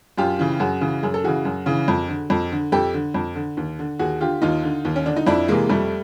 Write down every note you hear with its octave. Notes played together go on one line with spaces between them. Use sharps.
F#2 F4 G4
C#3 E3
F#2 F#4 G#4
C#3 E3
F#2 G#4
A4
C#3 E3 F#4 G#4
F#2
C#3 E3
F2
D3
F2
D3
F2 G4 A4
D3
F2
D3
D#2
D3
D#2 F#4 G#4
D3 F4 G4
D#2 D#4 F4
D3
D#2
C#4
D3 D4
D#4
F2 D4 E4
C3 E3 G#3 A#3
F2 G3 A3